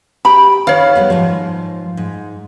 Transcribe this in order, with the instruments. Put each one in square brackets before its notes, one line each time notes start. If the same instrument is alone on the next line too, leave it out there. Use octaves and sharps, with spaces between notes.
[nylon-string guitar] G4 G5 [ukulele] B5
[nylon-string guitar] D#3 [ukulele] C#5 F5
[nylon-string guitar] G3 B3 B4
G#2 F3
G#2